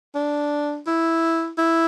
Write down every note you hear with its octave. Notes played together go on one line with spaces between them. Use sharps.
D4
E4
E4